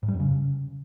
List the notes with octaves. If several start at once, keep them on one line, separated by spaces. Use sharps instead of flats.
G#2
G3
F2
C#3